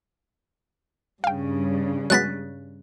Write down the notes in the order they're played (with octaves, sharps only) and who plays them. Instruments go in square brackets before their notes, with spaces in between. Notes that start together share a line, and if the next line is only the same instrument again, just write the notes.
[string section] G2 C#3 [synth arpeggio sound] F5 G5
[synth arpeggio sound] F#3 G#3 B3 [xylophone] F#6 A6 B6